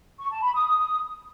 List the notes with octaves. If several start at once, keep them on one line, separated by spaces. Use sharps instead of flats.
C#6
A5
B5
D#6